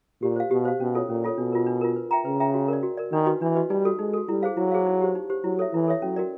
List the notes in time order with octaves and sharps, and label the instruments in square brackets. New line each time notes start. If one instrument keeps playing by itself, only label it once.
[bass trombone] A#2 [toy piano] G4
[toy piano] C5 F5
[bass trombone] B2 [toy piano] G4
[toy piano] C5 F5
[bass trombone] B2 [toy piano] C#4
[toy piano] F4 A4 C#5
[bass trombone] A#2 [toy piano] C#4
[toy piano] F4 A4 C#5
[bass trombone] B2 [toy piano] D4
[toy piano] F4 A#4
D4
F4 A#4
B4
E5 G5 A#5
[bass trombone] C#3 [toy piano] B4
[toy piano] E5 G5 A#5
F#4
A#4 D5
F#4
A#4 D5
[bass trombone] D#3 [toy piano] D4
[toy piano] F#4 B4 D#5
[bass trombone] E3 [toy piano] D4
[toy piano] F#4 B4 D#5
[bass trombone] G3 [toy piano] D#4
[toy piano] F#4 A4
[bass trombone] G#3 [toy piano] D#4
[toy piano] F#4 A4
[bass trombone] G3 [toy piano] E4
[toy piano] G#4 C5 F5
[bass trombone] F#3 [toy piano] E4
[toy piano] G#4 C5 F5
D#4
G4 C5
D#4
G4 C5
[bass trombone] F#3 [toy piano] E4
[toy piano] A4 C#5 E5
[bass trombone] E3 [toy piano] E4
[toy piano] A4 C#5 E5
[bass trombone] F#3 [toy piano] C#4
[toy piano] F#4 A#4 D5